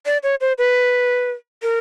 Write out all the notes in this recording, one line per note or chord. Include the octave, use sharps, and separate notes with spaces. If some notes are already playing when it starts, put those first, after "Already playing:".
D5
C#5
C5
B4
A#4